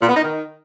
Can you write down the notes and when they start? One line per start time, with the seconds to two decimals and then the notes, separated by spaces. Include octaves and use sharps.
0.01 A#2
0.08 B3
0.15 D#4
0.22 D#3